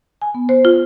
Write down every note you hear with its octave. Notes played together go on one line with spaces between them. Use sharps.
G#5
B3
C5
F4